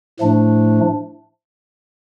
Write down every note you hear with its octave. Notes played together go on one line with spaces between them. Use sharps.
A2 F3 A3 D4